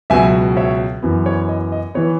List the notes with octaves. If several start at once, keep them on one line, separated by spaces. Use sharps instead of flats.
C#2 B2 F#3 E5 G#5
C#5 E5
F#2 E3 B3
C#5
D#5
D#5
E3 B3 C#5